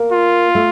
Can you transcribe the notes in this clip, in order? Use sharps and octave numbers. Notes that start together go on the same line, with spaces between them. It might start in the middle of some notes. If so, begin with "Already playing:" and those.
Already playing: A#3
F4
A3